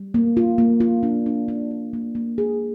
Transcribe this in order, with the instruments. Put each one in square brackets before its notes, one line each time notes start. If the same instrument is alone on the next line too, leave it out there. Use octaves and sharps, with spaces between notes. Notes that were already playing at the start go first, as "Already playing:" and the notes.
Already playing: [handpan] G3
A#3
F4
A#3
F4
D4
D4
D4
D4
A#3
A#3
G#4